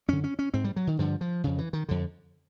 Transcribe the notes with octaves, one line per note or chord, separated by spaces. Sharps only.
F#2 D3 C#4
C#4
C#4
G#2 C4
G3
F#3
D#3
G2 D3 F3
F3
F2 C#3
E3
D#3
F2 D3